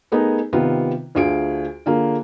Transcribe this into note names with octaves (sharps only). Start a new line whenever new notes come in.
A3 B3 D#4 G#4 A#4
C3 D#3 B3 F4
D2 D3 F4 G#4 D7
D3 A#3 F4 G#4